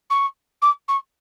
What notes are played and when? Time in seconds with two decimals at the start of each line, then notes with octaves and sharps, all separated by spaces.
0.10 C#6
0.62 D6
0.88 C#6